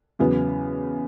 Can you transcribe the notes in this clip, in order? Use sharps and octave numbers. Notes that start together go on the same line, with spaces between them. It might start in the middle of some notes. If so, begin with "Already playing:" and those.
E2 C#3 F#3 B3